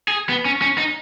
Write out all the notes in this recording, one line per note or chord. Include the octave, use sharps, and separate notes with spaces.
G#4
B3
C#4
C#4
D#4